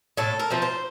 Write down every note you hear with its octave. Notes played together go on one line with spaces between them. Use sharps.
A2 A4
A#4
F3 A3 C4
C5